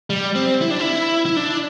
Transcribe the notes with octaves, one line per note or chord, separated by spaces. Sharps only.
G3
C4
E4
D4
E4
E4
D4